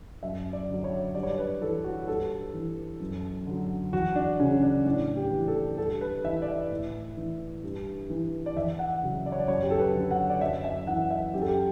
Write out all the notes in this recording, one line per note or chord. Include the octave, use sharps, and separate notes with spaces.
F#2 E5
D5
D3 F#3
C#5
G2 D5
C#5
D5
B4
E3 A4
F#4
G2 A4
E3
F#2
D3 F#3
E2 F#4
D4
C#3 F#3 C#4
D4
A2 D4
G4
E3
A4
G2 A4
B4
E3 E5
D5
E5
A2
E3
G2
E3
D5
E2 E5
F#5
C#3 F#3
D5
C#5
D5
F#2 C#5
G4
A4
B4
D3 F#3
F#5
D5
F#2 E5
E5
E3 F#5
E5
F#2 G4
A4
G4